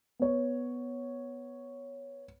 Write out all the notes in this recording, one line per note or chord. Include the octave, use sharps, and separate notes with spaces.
B3 C#5